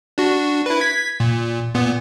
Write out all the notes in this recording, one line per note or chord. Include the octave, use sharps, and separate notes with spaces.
D4 F#4
E4 B4
G#6 B6
A#2
A#2 B3